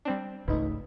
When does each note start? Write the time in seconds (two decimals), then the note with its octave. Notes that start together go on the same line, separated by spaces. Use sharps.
0.05 G3 C4 D4
0.48 G#1 C#2 G#2 A3 D#4 B4